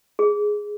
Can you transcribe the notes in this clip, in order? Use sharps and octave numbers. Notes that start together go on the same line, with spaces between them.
G#4